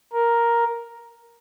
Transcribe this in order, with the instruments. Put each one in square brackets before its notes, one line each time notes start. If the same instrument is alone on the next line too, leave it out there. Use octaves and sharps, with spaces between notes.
[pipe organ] A#4